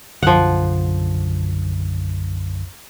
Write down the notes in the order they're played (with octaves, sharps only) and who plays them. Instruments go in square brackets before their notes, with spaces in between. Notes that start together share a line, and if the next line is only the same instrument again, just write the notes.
[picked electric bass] B1 F#2 D3 [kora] F3 F#5